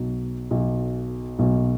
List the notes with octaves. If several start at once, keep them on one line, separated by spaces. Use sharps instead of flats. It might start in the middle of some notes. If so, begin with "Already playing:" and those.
Already playing: B1 B2 F#3
B1 B2 F#3
B1 B2 F#3